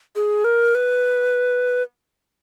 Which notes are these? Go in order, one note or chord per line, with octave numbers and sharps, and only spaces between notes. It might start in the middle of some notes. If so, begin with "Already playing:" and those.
G#4
A#4
B4